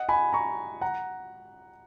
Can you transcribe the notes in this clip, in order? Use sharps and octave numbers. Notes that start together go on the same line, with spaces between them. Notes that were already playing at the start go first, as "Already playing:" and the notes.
Already playing: D#5 F#5
G#5 B5
A#5 C#6
F#5 A#5